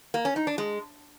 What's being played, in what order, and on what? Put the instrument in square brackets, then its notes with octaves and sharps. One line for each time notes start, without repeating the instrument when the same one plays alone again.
[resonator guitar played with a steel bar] A#3
C#4
D#4
D4
G#3